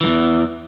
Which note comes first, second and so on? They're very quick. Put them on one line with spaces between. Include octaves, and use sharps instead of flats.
E3 G2 E2